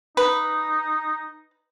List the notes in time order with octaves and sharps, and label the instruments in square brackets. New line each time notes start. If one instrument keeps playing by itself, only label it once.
[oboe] D#4 [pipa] B4